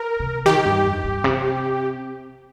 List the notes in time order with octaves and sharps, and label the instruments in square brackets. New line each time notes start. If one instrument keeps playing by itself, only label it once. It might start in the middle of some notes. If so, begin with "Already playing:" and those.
Already playing: [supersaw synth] A#4
[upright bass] C3
[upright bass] D#3 [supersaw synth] G4
[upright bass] G2
F2
G2
C3